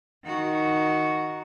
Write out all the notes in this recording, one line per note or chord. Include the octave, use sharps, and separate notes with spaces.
D#3 F#4